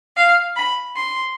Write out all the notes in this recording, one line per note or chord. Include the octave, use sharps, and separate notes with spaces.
F5
B5
C6